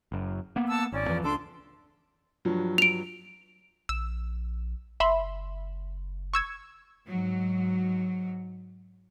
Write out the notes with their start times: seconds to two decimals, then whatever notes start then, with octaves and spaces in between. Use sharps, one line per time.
0.12 F#1 F#2
0.56 A#3 B3
0.68 F#5 A5 E6
0.92 G#1 C#4 D5
1.08 F2 E3 F3
1.23 C#2 D4 A4 C6 D6
2.45 G2 F3 F#3
2.78 D7 F7
3.89 A#1 E6
5.00 F#1 E5 B5 C6
6.34 C#6 E6 G#6
7.07 G#2 F#3